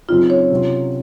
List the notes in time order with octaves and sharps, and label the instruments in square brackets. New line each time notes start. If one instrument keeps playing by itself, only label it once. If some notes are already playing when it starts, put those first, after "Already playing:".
[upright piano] F#2 C#3 F#3 C4 D#4 [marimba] F4
[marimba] C#5
[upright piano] C3 F#3 C#4 F4